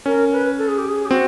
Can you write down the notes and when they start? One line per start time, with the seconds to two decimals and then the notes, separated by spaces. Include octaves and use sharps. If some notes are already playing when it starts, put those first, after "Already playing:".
0.06 C#4 A#4
0.32 B4
0.58 A4
0.68 G#4
0.78 G4
0.89 G#4
1.05 G4
1.10 C4 F#4